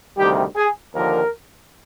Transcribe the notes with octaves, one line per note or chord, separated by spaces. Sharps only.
D2 C3 D#3 G3 G4
G#4
D#2 D3 F3 A#4